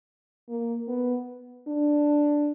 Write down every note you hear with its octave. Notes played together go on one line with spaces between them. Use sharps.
A#3
B3
D4